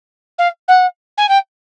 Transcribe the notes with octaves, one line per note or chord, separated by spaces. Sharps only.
F5
F#5
G#5
G5